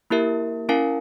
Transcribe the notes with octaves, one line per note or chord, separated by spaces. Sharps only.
A#3 E4 G4 A#4 E5
C#4 E4 A#4 F5 G#5